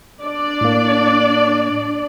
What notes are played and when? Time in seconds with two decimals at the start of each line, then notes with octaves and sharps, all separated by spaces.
0.22 D4 D5
0.61 A2 A#3